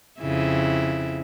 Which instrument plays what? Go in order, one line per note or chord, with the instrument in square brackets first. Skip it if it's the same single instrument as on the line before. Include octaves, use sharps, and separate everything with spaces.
[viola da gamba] F2 C#3 E4